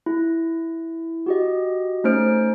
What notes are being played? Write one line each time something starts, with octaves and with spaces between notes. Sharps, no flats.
E4
F#4 G4 D#5
A3 C#4 D#4 C5 F6 D7